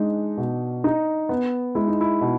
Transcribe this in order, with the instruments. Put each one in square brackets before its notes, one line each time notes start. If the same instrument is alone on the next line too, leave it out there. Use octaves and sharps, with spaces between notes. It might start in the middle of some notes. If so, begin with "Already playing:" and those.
Already playing: [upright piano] G#3 [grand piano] D4 D#4
[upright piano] B2
D#4
B3
[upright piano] G#3 [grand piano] E4
[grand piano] D#4
E4
[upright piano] B2